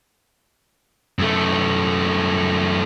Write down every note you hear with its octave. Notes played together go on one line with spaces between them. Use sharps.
F#2 A3